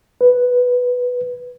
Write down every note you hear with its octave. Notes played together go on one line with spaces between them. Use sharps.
B4